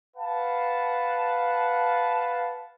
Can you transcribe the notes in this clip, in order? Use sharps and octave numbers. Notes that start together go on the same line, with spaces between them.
B4 F5 F#5 A5